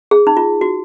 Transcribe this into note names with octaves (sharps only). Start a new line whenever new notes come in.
G#4
D#4
F4
F#4